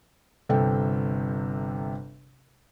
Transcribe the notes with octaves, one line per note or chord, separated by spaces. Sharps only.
G1 C3 A4 G5